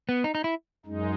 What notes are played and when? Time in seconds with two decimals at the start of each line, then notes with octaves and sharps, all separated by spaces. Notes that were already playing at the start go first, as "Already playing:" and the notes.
0.09 B3
0.24 D#4
0.35 D#4
0.44 E4
0.86 F#2 G#3 D#4